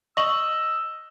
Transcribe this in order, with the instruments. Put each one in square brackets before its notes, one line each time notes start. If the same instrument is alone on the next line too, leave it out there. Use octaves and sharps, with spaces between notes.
[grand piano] D#5 F#7 [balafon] C#6 [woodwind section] E6